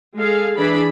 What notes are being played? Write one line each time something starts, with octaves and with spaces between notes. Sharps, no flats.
G#3 G#4 A4 F5
E3 D4 G#4 B5